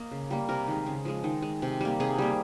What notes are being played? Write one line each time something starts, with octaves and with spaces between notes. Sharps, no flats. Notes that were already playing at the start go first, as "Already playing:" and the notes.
Already playing: A#3 D#5
C#3
G3 A#3
C3 A#4
D#3 G#3
C#3
F3 G#3
D#3
G#3
C3
G3 A#3
C3 G#4
G3 A#3